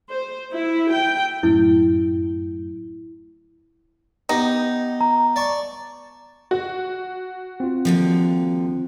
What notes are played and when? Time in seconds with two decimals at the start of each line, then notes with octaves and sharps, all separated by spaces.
0.11 C5
0.53 E4
0.91 G5
1.43 F#2 A2 E4
4.29 B3 D#4 G4
5.01 A#5
5.36 D5 A5 C#6
6.51 F#4
7.60 C4 F4
7.85 D#2 D3 F3